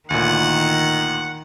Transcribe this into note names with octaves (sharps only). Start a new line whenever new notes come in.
D2 A#2 D#3 F#5